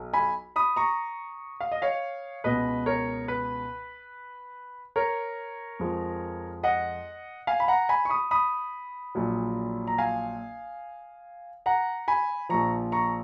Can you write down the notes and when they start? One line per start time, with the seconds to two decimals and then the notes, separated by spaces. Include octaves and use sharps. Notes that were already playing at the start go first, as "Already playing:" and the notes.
Already playing: B1 F#3
0.13 G#5 B5
0.56 B5 D#6
0.76 A#5 C#6
1.61 F5
1.72 D#5
1.82 C#5 F5
2.44 C#2 B2 G#3 B4 D#5
2.86 A#4 C#5
3.28 B4
4.96 A#4 C#5
5.79 F2 F3 G#3
6.63 D#5 F#5
7.47 F5 G#5
7.60 B5
7.68 F#5 A#5
7.89 G#5 B5
8.05 C#6
8.10 B5 D#6
8.31 B5 D#6
9.15 A#1 A#2 F#3
9.87 A#5
9.98 F5 G#5
11.66 F#5 A#5
12.08 G#5 B5
12.49 A#1 A#2 F3 A#5 C#6
12.92 A#5 C#6